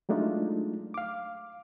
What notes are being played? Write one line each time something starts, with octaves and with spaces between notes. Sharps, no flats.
F#3 G#3 A3 D4 D#4 F4
F5 D6